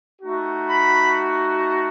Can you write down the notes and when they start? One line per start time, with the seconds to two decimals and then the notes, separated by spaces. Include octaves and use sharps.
0.22 A3 D#4 F#4
0.69 B5